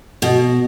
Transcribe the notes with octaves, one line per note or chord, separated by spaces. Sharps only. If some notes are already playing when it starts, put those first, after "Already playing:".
B2